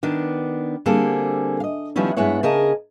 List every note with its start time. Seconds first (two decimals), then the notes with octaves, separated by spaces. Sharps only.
0.03 D#3 B3 D4
0.86 D3 G3 A#3 C4 G#4 A4
1.60 D#5 F5
1.96 D#3 F3 G3 B3 C#4 E4
2.17 G2 G#3 B3 E4 C#5 F#5
2.43 C#3 G#4 A#4 D#5 A5